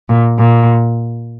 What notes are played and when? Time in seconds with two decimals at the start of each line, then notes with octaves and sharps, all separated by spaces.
0.08 A#2
0.38 A#2